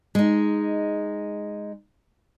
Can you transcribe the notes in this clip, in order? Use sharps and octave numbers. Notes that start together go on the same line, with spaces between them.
G#3 D#4